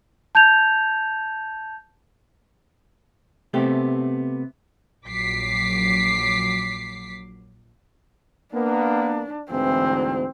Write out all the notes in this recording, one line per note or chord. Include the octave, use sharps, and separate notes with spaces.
A5 G6 G#6 F7
C3 A3 B3 G4
A#1 F#3 D6 B6 C7
A#3 B3 D4
D2 G#2 E3 C4